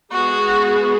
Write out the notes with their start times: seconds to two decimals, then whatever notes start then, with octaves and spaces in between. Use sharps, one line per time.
0.12 G#3 B3 F#4 G#4